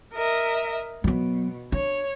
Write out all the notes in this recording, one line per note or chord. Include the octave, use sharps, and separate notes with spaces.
A#4 D#5 E5
B2 F#3 B3
D4 C#5